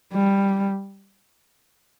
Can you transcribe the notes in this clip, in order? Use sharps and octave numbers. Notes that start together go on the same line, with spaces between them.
G3